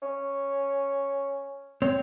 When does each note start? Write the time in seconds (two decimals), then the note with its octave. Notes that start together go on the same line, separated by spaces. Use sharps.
0.02 C#4
1.82 C4 C#5